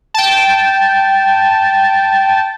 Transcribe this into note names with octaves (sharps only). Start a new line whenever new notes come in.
G5 A5